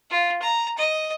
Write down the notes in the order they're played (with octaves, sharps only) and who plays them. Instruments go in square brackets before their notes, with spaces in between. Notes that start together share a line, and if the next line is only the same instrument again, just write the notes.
[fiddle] F4
A#5
D#5